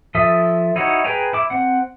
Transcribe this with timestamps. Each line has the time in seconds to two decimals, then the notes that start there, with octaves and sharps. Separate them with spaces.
0.15 F3 A4 E5 D#6
0.76 D#4 E4 F#4 C#5
1.04 G#4 B4 G5 G#5 A#5
1.33 E4 D6
1.50 C4 F#5